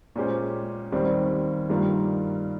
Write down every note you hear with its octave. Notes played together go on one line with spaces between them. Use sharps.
A#2 G#3 C#4 G4 C5
D#2 D#3 G3 C4
G2 D#3 G3 A#3 F4